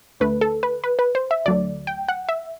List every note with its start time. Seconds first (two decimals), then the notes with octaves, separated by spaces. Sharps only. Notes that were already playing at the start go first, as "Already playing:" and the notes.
0.20 D2 D3 A3 B4
0.41 A4
0.63 B4
0.84 B4
0.99 B4
1.15 C5
1.31 E5
1.46 D2 D3 F#3 A3 D5
1.87 G5
2.09 F#5
2.29 E5